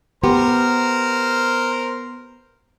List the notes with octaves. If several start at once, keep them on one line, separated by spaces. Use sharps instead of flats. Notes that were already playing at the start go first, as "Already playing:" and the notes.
B3 G4 A#4 C5